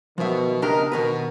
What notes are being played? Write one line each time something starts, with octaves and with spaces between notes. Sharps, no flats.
B2 D#3 F3 E5
C#2 D4 G4 A#4 D#5
B2 D#3 A#4 B4